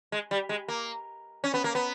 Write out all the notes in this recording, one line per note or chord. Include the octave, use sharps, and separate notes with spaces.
G#3
G3
G#3
A#3
C#4
B3
A#3
B3